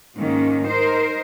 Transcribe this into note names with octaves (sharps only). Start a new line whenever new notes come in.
G#2 D#3 A#3 C#4
D#4 A#4 C5